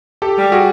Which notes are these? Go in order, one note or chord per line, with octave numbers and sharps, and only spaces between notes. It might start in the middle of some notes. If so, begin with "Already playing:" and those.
G4 A4
G3
F#4 G#4